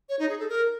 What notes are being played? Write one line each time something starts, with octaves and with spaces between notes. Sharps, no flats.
C#5
D#4
G#4
A4
A#4